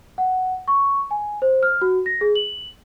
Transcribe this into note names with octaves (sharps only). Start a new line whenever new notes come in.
F#5
C#6
G#5
C5
F6
F#4
A#6
G#4
F#7